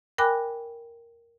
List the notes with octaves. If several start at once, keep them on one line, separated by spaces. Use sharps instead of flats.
A#4 G5 G#5 B5 D6 F#6